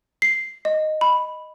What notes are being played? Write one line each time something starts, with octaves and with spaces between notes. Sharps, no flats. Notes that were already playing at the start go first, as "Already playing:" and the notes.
C7
D#5
B5